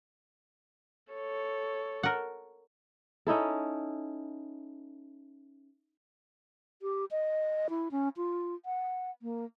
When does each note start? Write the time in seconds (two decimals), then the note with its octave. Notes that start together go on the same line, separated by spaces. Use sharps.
1.12 A4 C#5
2.03 A#4 F#5
3.27 C#4 D#4 E4 A4
6.82 G4
7.11 D#5
7.70 E4
7.91 C#4
8.17 F4
8.66 F#5
9.22 A#3